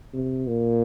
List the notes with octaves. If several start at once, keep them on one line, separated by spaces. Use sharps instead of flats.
C3
A#2